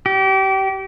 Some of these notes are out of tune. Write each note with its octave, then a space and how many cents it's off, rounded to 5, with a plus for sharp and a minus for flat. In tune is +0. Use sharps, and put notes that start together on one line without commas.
G4 -30